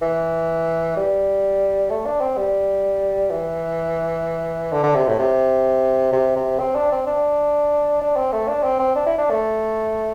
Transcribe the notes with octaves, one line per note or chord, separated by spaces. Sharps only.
E3
G3
A3
D4
C4
G3
E3
D3
D3
C3
A2
C3
C3
C3
C4
D4
C4
D4
D4
C4
A3
D4
C4
C4
D4
E4
D4
A3